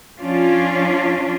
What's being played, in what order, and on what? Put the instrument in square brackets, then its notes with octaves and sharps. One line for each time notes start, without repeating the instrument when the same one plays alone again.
[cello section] F3 C#4 D4 F4